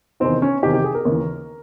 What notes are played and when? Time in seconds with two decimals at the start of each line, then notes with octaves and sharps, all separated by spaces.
0.20 E2 C3 D#3 C4
0.42 C#4
0.63 E2 C3 D#3 G4
0.74 G4
0.84 G#4
0.95 A#4
1.05 D#2 C#3 E3